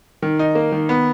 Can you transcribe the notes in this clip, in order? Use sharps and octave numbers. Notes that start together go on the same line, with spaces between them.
D#3
D#4
A#3
D#3
B3